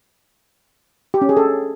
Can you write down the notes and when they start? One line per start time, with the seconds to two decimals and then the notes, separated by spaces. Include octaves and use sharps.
1.14 G4
1.22 C#4
1.29 G#4
1.37 A4